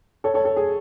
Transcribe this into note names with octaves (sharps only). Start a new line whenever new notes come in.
A4 C#5
A4 C#5
A4
G#4